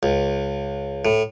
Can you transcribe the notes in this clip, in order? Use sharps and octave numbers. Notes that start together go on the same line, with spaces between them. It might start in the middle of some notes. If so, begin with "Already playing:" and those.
C#2
A2